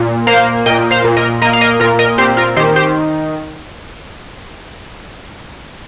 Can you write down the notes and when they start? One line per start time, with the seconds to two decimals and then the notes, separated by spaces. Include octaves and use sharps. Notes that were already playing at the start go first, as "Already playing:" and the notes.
Already playing: A#2
0.27 A#3 C5 F5
0.66 A#2 D#5 G5
0.91 C5 F5
1.04 A#2
1.17 A#4 D#5
1.42 A#3 A#4 D#5
1.53 F5
1.61 A#4 D#5
1.80 A#2 F4 A#4
1.99 A#4 D#5
2.18 C4 G4 C5
2.37 F4 A#4
2.56 D#3 G4 C5
2.76 G4 C5